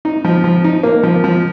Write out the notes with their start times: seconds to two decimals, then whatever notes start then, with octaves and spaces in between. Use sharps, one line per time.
0.05 D#4
0.24 F3
0.44 F3
0.64 D#4
0.83 A#3
1.03 F3
1.24 F3